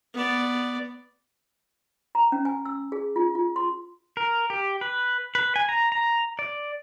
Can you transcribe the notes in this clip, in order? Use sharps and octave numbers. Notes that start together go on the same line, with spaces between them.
B3 D5
A#5
C#4
G#5
E6
G#4
F4
F4
C6
A#4
G4
B4
B4
G#5
A#5
A#5
D5